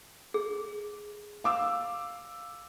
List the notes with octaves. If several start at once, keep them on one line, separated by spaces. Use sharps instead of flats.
G#4
F5 D6 E6